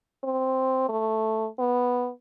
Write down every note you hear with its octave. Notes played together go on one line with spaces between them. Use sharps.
C4
A3
B3